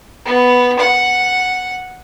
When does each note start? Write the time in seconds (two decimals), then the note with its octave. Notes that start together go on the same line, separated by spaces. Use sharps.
0.25 B3
0.79 F#5